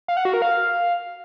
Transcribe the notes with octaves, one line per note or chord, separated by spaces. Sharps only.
F5
F#5
F#4
A#4
F5